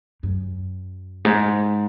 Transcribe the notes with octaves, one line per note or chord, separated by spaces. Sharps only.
F#2
G#2